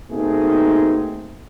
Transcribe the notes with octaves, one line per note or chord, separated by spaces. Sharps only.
B2 A3 A#3 C4 D#4 G#4